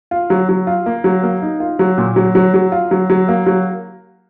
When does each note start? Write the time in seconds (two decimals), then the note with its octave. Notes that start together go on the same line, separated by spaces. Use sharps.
0.11 F4
0.30 F#3
0.49 F#3
0.67 F4
0.86 A#3
1.04 F#3
1.23 A#3
1.42 D#4
1.60 F4
1.79 F#3
1.98 A#2
2.16 F#3
2.35 F#3
2.54 F#3
2.72 F4
2.91 F#3
3.10 F#3
3.28 A#3
3.46 F#3